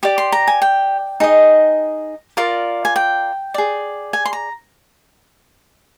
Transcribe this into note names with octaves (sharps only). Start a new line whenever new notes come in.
G4 D5 D6
C6
A#5
G#5
G5
D#4 G#4 D#5
F4 A#4 D5
G#5
G5
G#4 D5
G#5
C6
A#5